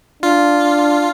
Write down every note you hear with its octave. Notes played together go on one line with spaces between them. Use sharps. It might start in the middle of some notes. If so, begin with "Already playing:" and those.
D4 F4